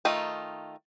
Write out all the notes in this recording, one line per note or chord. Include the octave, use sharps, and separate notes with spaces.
D#3 A3 D#4 F4